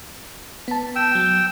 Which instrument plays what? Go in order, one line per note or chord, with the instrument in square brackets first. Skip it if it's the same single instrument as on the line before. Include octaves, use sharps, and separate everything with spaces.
[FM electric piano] B3 A5
[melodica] G5 E6
[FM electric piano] F#3